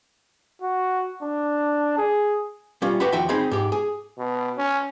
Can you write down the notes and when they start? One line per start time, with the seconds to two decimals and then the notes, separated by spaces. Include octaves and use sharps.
0.62 F#4
1.23 D4
1.98 G#4
2.82 G3 C#4 F4
3.00 F#4 G4 B4 F#5 B5
3.12 D#2 F3 F#4 E5 G5
3.29 C4 D#4 G#4 C5 B5
3.51 G#2 G4
3.72 G#4
4.18 B2
4.57 C#4